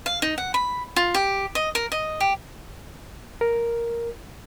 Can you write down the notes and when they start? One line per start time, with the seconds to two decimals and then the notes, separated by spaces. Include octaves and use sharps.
0.06 F5
0.22 D#4
0.38 F#5
0.54 B5
0.96 F4
1.14 G4
1.55 D#5
1.75 A#4
1.92 D#5
2.20 G4
3.41 A#4